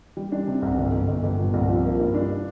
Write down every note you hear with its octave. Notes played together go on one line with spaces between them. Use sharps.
G3
D4
C3
C2
G1
G1
G1
G1
A#2
C2
F3
A#3
G2
D4